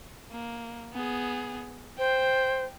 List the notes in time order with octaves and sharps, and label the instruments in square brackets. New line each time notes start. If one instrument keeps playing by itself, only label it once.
[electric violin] A#3
B3 G#4
[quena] C5 [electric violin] G5